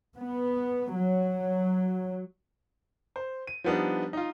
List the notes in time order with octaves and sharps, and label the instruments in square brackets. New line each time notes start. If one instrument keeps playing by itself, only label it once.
[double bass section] B3
F#3
[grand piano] C5
D#7
F3 G3 B3 D4 D#4
D#4 F4